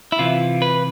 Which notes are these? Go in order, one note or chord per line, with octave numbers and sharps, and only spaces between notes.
E4
C3 E3 F4
B4